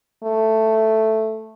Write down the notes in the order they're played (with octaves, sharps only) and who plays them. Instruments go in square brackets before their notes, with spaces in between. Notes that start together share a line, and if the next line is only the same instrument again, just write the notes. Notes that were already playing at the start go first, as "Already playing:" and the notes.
[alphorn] A3